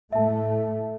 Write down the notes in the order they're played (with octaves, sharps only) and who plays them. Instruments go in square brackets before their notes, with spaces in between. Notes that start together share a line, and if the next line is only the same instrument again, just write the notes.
[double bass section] A2 A3 [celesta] E5 A5